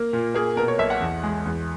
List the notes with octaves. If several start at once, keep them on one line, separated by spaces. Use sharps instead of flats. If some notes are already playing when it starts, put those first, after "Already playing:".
Already playing: A#3
A#2
A#3 G#4
B2 A#4
C#5
B1 E5
F#5
E2
G#3
E2